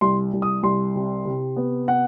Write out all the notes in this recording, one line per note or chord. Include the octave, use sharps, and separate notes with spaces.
C2 C6
C2
D#6
C2 C6
C3
C3
B3
B3 F#5